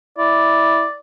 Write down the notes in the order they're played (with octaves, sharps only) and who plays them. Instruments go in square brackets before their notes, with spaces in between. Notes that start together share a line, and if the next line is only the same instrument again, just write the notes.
[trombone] E4 [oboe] D5